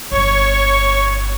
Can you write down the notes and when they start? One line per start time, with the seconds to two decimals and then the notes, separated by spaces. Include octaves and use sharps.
0.11 G1 C#5 C#6